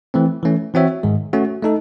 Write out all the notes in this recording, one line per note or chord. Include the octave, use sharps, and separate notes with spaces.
E3 A3 C4
E3 A3 C#4
E3 C4 F#4 C#5 E5
G#2 D#3 G#3
A3 C#4 F#4
A3 D#4 A4